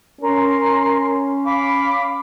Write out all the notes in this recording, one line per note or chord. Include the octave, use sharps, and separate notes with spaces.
C#4 A#4 C6
F5 B5 D6